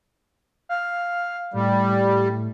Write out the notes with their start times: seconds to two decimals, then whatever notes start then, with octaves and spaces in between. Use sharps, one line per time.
0.69 F5
1.54 A2 G3